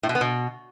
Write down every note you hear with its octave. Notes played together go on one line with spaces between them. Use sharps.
A2
B2
B3
B2